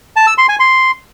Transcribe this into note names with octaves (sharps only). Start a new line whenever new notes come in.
A5
E6
C6
G#5
C6